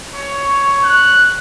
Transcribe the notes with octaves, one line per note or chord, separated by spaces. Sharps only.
C#5
F#6